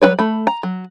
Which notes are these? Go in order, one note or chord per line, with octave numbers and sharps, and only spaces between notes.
F#3 G3 F4 B4 C#5
A3 B5
A#5
F#3